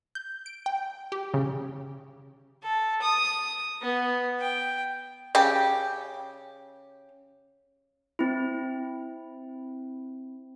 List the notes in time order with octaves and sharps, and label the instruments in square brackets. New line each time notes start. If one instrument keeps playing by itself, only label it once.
[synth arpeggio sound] G6
D7
G5
G4
C#3
[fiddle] A4
D#6
B3
G5
[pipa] C#3 G4
[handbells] C4 E4